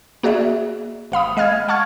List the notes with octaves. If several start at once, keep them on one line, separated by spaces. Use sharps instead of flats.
A#3 F#4 G#4 D5 E5
G#1 F5 B5 D#6
G#3 D#5 F5 F6 G#6
F#5 A5 C#6 F6 G#6